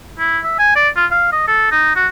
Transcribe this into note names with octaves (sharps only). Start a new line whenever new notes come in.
E4
E5
G#5
D5
F4
F5
D#5
A4
D#4
F#4